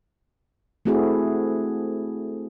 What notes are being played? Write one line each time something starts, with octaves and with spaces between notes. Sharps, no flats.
A3 C4 E4 F#4 G#4 A4